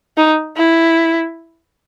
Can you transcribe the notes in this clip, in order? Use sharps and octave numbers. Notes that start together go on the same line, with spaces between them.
D#4
E4